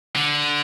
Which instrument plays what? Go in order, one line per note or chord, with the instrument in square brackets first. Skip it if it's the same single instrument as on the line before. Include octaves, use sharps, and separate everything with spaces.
[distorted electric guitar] D3